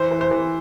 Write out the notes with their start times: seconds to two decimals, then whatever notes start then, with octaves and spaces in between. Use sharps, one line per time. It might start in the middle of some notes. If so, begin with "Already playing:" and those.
Already playing: E3 C5
0.11 E3
0.21 C5
0.31 E3